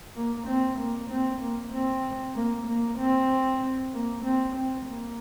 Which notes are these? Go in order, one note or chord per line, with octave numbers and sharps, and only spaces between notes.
A#3
C4
A#3
C4
A#3
C4
A#3
A#3
C4
A#3
C4
C4
A#3